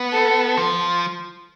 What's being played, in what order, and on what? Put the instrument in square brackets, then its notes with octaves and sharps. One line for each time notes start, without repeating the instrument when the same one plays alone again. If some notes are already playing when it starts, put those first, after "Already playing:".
Already playing: [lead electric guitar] B3
[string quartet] A4
[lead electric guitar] F3